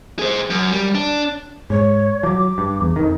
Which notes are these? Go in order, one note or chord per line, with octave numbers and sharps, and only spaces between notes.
G#4 C5
F#2
G3
D4
G#2 C#5
F3 F#3 D6
G2
E2
F2 D#3 D#4